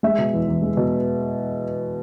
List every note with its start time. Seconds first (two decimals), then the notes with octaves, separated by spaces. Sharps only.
0.03 G#3 E5
0.18 B2
0.33 E2
0.48 E2
0.62 G#3
0.77 B2